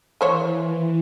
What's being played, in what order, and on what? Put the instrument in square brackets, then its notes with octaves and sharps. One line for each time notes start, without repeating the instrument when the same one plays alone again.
[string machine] E3 [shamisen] A#3 C5 C#5